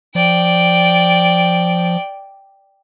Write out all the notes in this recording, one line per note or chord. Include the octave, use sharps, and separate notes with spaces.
F3 D5 G5